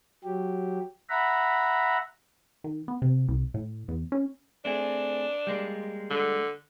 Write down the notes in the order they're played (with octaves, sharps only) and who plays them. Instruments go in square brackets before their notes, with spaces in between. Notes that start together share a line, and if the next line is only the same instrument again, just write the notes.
[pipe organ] F#3 G4
E5 F#5 A#5 B5
[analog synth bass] D#3
B3
C3
C2
A2
E2
C#4
[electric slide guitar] A3 C4 G#4 [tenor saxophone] D4
[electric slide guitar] G3 G#3 A#3
[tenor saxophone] D3